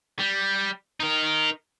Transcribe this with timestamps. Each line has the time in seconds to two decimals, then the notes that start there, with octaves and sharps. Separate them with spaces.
0.19 G3
1.00 D#4 A#4